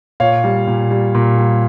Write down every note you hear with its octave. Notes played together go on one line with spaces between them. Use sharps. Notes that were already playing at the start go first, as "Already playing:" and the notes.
A#2 C#5 F5
G3
A#2
G3
A#2
G3